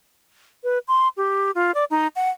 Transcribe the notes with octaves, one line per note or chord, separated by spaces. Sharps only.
B4
C6
G4
F4
D5
D#4
F#5